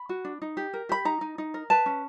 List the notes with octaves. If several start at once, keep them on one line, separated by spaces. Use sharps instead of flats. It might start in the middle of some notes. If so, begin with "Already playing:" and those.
Already playing: B5
F#4
D4
D#4
G4
A#4
G4 B5
D#4 A#5
D#4
D#4
A#4
B4 A5
C#4